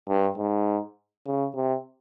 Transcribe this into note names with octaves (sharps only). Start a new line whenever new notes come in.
G2
G#2
C#3
C3